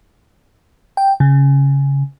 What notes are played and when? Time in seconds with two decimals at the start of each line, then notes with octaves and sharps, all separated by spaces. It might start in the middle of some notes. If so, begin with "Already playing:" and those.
0.97 G5
1.20 C#3